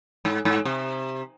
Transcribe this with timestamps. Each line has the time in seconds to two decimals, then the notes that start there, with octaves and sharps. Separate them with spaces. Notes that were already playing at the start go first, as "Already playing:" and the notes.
0.25 G#2
0.45 G#2
0.65 C3